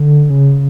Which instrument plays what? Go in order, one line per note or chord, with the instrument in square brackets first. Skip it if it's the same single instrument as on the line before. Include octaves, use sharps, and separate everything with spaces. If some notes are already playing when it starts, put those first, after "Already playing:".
Already playing: [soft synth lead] D3
C#3